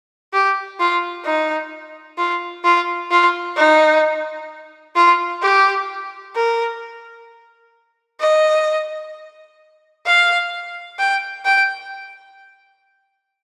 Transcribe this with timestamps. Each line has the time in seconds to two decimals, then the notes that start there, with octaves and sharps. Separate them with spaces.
0.33 G4
0.80 F4
1.25 D#4
2.18 F4
2.64 F4
3.11 F4
3.57 D#4
4.96 F4
5.43 G4
6.36 A#4
8.20 D#5
10.06 F5
10.99 G5
11.45 G5